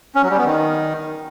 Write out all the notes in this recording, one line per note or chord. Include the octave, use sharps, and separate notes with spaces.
C#4
F#3
G3
B3
D#3